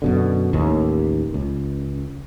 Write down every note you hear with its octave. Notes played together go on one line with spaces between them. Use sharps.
F#2 B2 D3
A1 D#2
C#2